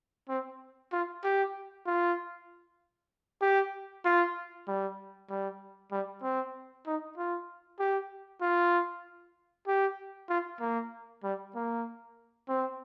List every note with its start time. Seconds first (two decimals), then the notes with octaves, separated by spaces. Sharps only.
0.29 C4
0.93 F4
1.24 G4
1.86 F4
3.42 G4
4.05 F4
4.68 G3
5.30 G3
5.92 G3
6.23 C4
6.87 D#4
7.18 F4
7.80 G4
8.42 F4
9.68 G4
10.29 F4
10.60 A#3
11.24 G3
11.55 A#3
12.49 C4